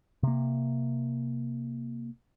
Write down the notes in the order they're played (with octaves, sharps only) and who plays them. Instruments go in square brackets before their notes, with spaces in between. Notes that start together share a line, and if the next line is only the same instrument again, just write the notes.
[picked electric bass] C3 A#3